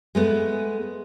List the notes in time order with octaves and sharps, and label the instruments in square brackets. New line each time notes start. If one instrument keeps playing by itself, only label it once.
[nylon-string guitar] G#3 A3 B3